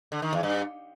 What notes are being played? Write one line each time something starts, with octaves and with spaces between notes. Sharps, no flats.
D3
D#3
E2
G2